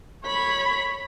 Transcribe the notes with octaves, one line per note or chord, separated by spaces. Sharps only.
C#5 B5